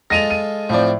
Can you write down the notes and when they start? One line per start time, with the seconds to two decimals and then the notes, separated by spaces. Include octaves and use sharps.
0.10 G#3 F4 A4 A#6 D#7 F7
0.30 D#7
0.69 A2 F3 C4 D5